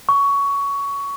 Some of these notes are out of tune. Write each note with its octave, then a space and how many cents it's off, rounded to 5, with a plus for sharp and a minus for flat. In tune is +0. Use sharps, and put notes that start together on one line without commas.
C#6 +15